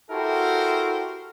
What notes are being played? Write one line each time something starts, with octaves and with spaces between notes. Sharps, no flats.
E4 F#4 G4 A4 A#4 C5